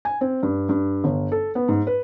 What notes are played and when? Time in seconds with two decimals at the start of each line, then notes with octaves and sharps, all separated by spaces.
0.05 G#5
0.21 C4
0.43 G2
0.69 G2
1.04 G1
1.32 A4
1.55 B3
1.68 G#2
1.87 B4